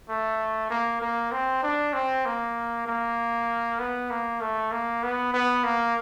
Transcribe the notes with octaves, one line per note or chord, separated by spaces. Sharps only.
A3
A#3
A#3
C4
D4
C4
A#3
A#3
B3
A#3
A3
A#3
B3
B3
A#3